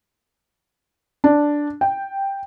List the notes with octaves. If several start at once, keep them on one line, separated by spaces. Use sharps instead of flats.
D4
G5